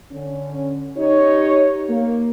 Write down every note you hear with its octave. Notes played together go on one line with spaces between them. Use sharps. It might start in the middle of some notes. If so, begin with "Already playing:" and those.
D3 C#4
D#4 G4 C#5
A#3